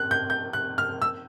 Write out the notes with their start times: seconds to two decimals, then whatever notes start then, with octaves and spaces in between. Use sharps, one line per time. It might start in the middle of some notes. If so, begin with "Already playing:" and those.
Already playing: F#6
0.11 G6
0.30 G6
0.53 F#6
0.78 F6
1.02 E6